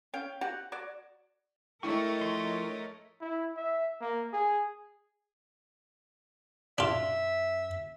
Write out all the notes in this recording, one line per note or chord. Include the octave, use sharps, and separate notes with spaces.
C#4 F5 G5
F#4 G4 F#5
F#4 C#5 D5
A3 D4 E4 A#4 C#5 D#5 G5 C#6
F3 C6
E4
E5
A#3
G#4
F#2 D4 F4 E5